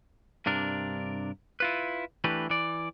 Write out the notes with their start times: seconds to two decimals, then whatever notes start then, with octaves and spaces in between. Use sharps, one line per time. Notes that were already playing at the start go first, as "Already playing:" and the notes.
0.46 G2 C3 D4 A#4
1.60 E4 F4 B4
2.24 E3 A3 D4 G4 B4
2.50 E3 D5